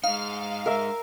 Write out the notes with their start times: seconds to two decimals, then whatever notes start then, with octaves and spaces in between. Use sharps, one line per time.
0.04 G#3 D#4 F5
0.66 A#4 E5